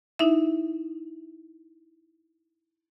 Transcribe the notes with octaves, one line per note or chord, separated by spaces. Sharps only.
D#4 E4 E5